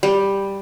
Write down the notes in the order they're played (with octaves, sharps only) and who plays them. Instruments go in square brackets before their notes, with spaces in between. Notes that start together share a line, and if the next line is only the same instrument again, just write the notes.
[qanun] G3